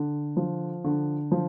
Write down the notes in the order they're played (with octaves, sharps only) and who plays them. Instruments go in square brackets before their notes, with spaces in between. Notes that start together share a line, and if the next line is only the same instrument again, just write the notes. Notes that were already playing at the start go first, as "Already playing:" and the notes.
Already playing: [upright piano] D3
F3
D3
F3